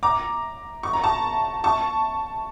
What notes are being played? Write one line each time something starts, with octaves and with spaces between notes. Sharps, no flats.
A#5 D6
C#6
A#5
A5 C#6
A5 C#6